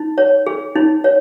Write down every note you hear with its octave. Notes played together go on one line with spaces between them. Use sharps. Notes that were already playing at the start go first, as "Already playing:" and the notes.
Already playing: D#4
C#5
G#4
D#4
C#5